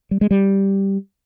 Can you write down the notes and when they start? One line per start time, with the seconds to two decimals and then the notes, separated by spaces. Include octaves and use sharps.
0.11 G3
0.21 G#3
0.31 G3